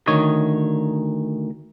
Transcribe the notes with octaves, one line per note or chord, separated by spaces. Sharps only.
D2 D#3 C#5 D#5